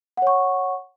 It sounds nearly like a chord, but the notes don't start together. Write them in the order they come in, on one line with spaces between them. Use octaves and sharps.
F#5 C#5 C#6